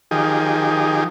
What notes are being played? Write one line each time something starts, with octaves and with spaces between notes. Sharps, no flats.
D#3 F3 G4 G#4